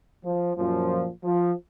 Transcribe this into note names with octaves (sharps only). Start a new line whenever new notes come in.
F3
F#2 A#2 F3
F3